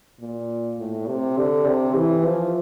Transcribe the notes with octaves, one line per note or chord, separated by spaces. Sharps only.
A#2
A2
C3
D3
C3
E3
F3